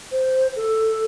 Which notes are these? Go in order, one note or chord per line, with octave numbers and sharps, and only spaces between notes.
C5
A4